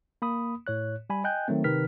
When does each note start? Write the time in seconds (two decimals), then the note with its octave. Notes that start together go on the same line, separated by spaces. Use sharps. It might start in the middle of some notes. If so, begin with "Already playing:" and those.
0.22 A#3 B5 D#6
0.67 A2 C#5 F#6
1.10 G3 G#5 B5
1.24 D#5 G5 G#5 F#6 G6
1.48 D#3 F#3 A3 C4
1.64 C3 D#3 B4 F6 B6